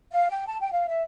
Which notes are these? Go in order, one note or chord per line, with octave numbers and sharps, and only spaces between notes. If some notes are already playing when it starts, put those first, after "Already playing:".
F5
G5
A5
G5
F5
E5